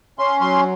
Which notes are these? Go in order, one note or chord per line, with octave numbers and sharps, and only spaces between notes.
C#4 C6
F#3 C6